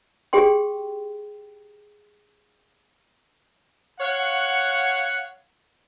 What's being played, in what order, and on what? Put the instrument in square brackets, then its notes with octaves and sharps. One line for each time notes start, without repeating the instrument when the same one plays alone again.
[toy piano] G4 G#4 G5 C6
[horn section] C#5 F5 F#5